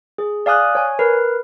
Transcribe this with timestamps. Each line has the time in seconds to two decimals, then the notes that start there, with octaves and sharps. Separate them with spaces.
0.18 G#4
0.46 D5 F5 G#5 D#6 F#6
0.75 C#5 G#5
0.99 A#4 B4